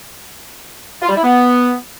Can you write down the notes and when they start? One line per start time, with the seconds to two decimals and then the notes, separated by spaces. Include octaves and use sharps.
1.02 F4
1.09 G3
1.16 E4
1.24 B3